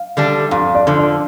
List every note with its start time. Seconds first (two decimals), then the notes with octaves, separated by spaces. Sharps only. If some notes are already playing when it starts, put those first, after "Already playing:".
Already playing: F5
0.17 D3 G3 D4
0.51 F2 F5
0.75 D5
0.87 D3 F3
0.99 D5